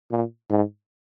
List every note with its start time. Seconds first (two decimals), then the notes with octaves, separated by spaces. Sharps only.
0.11 A#2
0.50 G#2